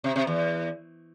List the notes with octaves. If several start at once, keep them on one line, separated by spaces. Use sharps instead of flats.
C3
C3
E2